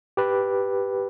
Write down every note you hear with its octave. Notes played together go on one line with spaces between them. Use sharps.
G4 B4